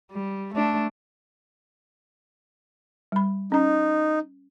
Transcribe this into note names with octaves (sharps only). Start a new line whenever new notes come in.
G3
A3 D4
G3 B5
C#4 D#4 A#5